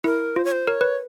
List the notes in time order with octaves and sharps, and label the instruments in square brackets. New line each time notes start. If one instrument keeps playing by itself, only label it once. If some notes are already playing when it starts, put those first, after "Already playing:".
[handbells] E4 [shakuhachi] A#4
[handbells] F4 [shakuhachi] C5
[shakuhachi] C#5
C5
[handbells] A#4 [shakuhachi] C#5
[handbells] B4